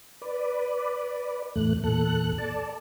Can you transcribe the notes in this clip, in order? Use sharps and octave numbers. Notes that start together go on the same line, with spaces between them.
B4 D5
E2 A2 A3 F#6
E2 A#2 A4 F#6
A4 D5 A5